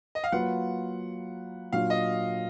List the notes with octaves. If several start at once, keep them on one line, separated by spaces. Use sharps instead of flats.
D#5
F5
F#3 A#3 F4 B4 F#5
A#2 F#3 D4 F4 F5
D#5